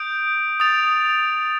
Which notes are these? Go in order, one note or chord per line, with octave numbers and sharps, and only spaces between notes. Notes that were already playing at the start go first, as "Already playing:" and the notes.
Already playing: D#6 G6 D7
D#6 A6 D7 F7